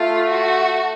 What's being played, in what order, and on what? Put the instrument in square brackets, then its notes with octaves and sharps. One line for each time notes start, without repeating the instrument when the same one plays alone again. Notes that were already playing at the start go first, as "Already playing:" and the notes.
Already playing: [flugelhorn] A3 [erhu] F4
[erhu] F#4